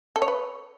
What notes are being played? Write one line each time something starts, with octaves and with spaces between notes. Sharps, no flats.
A4
C#5
B4